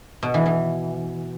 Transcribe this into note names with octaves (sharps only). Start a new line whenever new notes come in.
B2
E3
E3